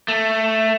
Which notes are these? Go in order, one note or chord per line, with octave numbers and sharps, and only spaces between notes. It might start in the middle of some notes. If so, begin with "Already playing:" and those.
A3